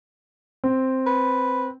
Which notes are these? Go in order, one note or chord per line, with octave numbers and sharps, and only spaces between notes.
C4
B4